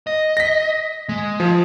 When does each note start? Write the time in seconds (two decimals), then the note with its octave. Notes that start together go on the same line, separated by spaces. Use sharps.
0.07 D#5
0.37 A#6 B6
1.09 G#3
1.40 F3